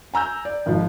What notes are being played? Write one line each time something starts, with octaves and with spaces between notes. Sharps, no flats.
G#5 A#5 E6 G6
D5
G#1 G#2 F3